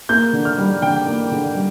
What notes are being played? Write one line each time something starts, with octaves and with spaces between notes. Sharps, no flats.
A#3 G6
D3
F6
G3
D3 G5
A#3
D3
G3